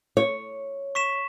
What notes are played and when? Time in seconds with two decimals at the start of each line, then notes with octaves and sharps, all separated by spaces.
0.17 C#5
0.95 C#6 B6 E7